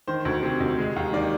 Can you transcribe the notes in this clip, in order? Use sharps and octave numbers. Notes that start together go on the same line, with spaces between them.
D#3 C5
D2
C3
D2
G#3
D#2
D#3 D5